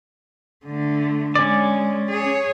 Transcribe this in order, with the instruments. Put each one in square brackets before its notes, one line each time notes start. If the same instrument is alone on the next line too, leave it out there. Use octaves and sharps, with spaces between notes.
[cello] D3 A3
[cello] G#3 [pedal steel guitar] C#4 D5
[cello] G#4 C#5